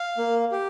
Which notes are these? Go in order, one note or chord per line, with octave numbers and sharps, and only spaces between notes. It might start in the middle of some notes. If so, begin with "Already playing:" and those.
Already playing: F5
A#3
G4